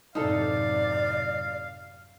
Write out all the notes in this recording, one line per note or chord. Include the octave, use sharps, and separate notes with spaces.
F#2 A2 C3 D#4 A4 D5 F5